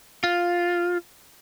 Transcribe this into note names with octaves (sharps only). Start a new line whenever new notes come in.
F4